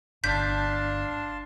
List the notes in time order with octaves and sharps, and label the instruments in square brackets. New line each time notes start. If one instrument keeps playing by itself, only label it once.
[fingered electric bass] G1 [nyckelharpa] D4 [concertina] F5 A5 C6 [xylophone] G6 B6